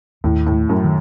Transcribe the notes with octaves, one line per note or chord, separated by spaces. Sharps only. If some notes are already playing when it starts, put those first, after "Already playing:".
D#2 A2
A2
A3
F#2
D#3